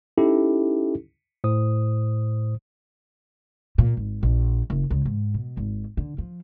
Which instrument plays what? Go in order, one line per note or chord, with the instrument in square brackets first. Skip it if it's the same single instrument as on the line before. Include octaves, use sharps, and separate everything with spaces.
[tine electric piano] C#4 D#4 E4 G4 A4
A2 C5 D#6
[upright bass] A#2
G#1
A#1
F#1
C#2
G#2
B2
G#1
D3
F3